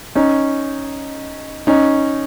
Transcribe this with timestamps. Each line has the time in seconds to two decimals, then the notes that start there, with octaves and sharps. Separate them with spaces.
0.15 C#4 D#4
1.67 C#4 D#4